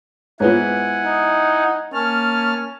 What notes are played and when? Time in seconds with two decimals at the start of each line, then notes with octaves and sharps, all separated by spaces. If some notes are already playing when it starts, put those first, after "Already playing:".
0.40 G#2 B3 E4 F4 B4 C#5 F#5 G#5
1.05 D#4
1.93 A#3 C#4 A5 F6